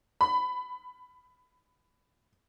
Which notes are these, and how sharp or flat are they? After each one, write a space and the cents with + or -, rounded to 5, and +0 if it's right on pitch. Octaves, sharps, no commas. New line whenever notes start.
B5 +15